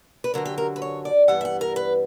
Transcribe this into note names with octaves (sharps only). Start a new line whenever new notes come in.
B4
F#2 D3 F#3 A#4
G4
A#4
B4
C#5
D5
G2 E3 G3 B3 F#5
E5
F#5
A#4
B4